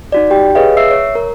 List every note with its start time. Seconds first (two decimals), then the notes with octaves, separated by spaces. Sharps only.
0.12 D#4 F#4 D5
0.30 G4 G5
0.55 G#4 B4 C#5 D#5 F5
0.77 E5 E6 C7
0.91 C#5
1.15 A#4